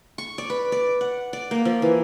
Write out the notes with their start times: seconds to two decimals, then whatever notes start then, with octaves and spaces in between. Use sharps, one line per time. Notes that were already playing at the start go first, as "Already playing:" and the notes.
0.18 C#6
0.38 D5
0.50 B4
0.72 D5
1.01 F#5
1.33 D5
1.51 A#3
1.65 F3
1.82 E3